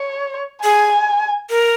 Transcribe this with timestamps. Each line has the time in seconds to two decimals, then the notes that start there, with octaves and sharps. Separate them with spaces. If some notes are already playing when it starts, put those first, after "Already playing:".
Already playing: C#5
0.63 G#4 G#5
1.50 A#4